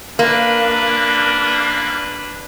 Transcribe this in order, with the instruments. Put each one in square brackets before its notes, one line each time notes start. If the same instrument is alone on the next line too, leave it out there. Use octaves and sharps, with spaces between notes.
[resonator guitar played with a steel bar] A#3 [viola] D4 B4